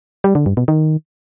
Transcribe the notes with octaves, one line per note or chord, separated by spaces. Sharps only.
G3
D3
G2
B2
D#3